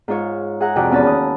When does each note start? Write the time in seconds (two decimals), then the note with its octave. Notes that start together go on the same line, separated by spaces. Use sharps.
0.08 G#2 F4 C#5
0.60 G#4 E5 F#5 A#5
0.76 F2 C3 C4 F#4 D5 F#6
0.91 E2 C#4 A5 B5
1.03 D#2 D#6